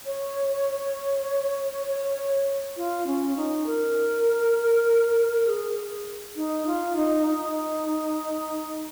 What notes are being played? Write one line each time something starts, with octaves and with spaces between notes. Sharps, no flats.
C#5
C#5
F4
C#4
D#4
A#4
G#4
D#4
F4
D#4
D#4